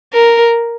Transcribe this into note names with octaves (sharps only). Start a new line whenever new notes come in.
A#4